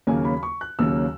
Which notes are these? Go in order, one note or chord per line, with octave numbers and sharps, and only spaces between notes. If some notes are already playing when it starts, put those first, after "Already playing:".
D#2 C#3 F#3 A#3 C#4 G#5
B5
C#6
F#6
D#2 C#3 F#3 A#3 C#4 E6